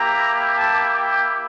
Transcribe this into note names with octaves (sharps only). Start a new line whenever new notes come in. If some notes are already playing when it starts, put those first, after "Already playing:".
Already playing: A#3 E4 G4 A#5
A5
G5